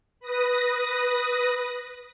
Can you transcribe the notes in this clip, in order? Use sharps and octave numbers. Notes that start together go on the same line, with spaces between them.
B4 D#6 A#6